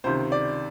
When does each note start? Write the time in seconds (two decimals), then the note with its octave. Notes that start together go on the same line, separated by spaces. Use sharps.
0.04 C#2 C3 D#3 C5
0.32 D5